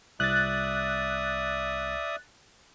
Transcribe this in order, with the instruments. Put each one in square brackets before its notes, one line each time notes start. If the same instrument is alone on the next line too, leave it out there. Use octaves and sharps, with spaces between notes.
[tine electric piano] C2 [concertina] D5 E5 D#6 [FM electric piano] F#6 A6